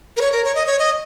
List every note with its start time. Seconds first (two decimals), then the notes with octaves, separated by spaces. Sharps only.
0.17 A#4
0.21 C#5
0.32 A#4
0.44 C#5
0.55 D#5
0.66 C#5
0.79 D#5